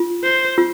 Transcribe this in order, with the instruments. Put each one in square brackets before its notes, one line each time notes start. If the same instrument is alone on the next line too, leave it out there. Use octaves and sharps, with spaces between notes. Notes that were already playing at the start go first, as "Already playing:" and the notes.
Already playing: [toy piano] F4
[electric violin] C5
[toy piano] F4